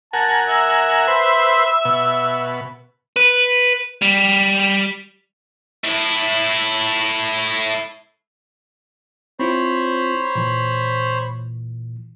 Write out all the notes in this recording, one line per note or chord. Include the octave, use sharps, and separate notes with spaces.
A#4 F#5 G#5 A5
E5
B4 C5
B2
B4
G3
A3 E4
C4 E4 F4 C5 C#5 B5
A#2 E3